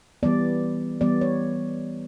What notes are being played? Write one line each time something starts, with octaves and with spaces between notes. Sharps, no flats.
E3 G3 B3 D5
E3 G3 B3 D5
C#5